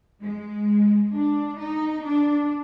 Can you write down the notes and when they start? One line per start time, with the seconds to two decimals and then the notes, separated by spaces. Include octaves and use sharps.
0.22 G#3
1.13 D4
1.60 D#4
2.05 D4